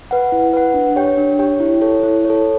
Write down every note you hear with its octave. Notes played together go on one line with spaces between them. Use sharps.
B4 F#5
E4
B4 F#5
D4
G4 C#5 G5
D4
G4 C#5 G5
E4
A4 C#5
E4
A4 C#5